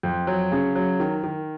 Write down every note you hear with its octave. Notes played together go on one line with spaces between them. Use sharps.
F2
F#3
C#3
F#3
D#3
D#3